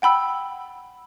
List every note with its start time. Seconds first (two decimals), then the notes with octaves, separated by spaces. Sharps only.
0.02 F#5 G5 B5 E6